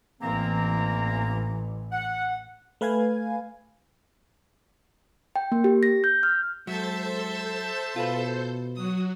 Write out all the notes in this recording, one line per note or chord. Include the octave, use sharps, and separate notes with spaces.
A1 E3 A#3 C4 A#5
F#5
A3 B4 F5 G#5 G#6
G5
A#3
G4
A#6
G6
F6
F#3 G#3 A4 C5 E5 A5 G6
B2 F4 B4
F#3 F#4 D#6